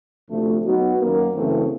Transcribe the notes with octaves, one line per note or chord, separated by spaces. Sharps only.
D2 C3 F3 A3
F#3 B3 D#4 F#4
F#2 D#3 F#3 A#3
F#2 C#3 E3 A3 C4